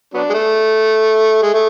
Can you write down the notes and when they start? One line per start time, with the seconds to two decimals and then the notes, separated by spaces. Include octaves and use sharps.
0.14 F#3 B3 D4
0.29 G#3
0.34 A3
1.43 G#3
1.54 A3